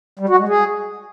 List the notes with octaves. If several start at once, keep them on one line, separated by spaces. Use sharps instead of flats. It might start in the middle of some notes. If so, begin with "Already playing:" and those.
G3
F#4
G#3
G#4